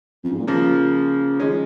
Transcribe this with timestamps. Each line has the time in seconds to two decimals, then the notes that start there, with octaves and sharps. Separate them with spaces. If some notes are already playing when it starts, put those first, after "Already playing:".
0.24 F2
0.32 G#2
0.39 A#2
0.47 C#3 F3 A#3
1.40 D#3 G#3 C#4
1.48 F3